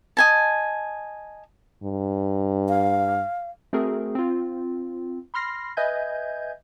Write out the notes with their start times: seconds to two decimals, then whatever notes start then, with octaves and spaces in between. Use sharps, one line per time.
0.17 D#5 G#5 A5
1.83 G2
2.69 F5
3.73 A3 C4 F#4 G#4 A#4
4.15 C4 F4
5.34 B5 C6 F6 A#6 C7
5.77 B4 D#5 E5 G#5 G6 G#6